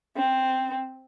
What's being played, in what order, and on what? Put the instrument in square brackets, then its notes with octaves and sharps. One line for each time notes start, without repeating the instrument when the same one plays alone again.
[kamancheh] C4